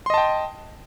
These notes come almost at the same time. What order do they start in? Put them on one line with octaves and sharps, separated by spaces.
C6 D#5 A5 G5